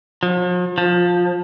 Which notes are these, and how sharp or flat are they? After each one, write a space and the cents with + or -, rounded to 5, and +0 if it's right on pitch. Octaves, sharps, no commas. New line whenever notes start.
F3 +45
F3 +15